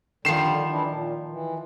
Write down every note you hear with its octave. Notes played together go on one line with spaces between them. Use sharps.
D3 D#3 F3 G3 C7 E7
E3 D4 E4
A#2
E3